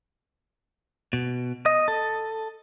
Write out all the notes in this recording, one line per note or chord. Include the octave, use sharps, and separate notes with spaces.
B2
D#5
A4